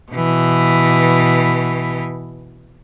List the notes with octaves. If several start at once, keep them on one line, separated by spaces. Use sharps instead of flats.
B2 E3